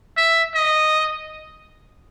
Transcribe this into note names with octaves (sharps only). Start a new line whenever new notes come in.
E5
D#5